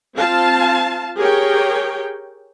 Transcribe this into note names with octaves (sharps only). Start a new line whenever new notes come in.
C4 F4 F5 A5
G4 G#4 A#4 C#5 G5